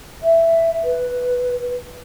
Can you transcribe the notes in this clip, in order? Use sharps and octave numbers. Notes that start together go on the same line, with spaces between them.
E5
B4